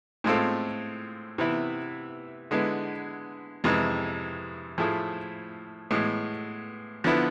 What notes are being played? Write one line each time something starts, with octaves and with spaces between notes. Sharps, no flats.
A2 G#3 C4 F4 A4
C3 E3 B3 E4
D3 G#3 B3 E4 B4
F2 C3 E3 G#3
A2 F3 A3 E4 G#4
A2 E3 G#3 B3
D3 F3 B3 E4